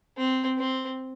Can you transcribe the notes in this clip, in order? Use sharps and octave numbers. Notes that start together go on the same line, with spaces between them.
C4
C4